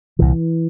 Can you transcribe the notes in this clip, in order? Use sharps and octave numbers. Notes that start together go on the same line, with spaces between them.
C2 A#2 E3